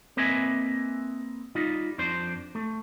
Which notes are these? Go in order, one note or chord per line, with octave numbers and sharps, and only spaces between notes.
A#3 C4 B4 D#5 E5 G#5
G3 D#4 F4
F2 D4 C5 C6
A3